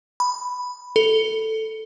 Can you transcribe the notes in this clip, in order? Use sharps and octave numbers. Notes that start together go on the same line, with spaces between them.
B5
A4